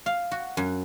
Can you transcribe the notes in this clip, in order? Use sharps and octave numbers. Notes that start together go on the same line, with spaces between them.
F5
F#4
F#2